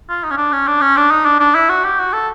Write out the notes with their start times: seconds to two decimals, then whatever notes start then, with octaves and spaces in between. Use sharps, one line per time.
0.09 F4
0.23 D#4
0.31 C#4
0.37 D4
0.52 C#4
0.67 D4
0.81 C#4
0.97 D4
1.11 D#4
1.25 D4
1.40 D4
1.55 E4
1.69 F#4
1.85 G4
1.99 F#4
2.13 A4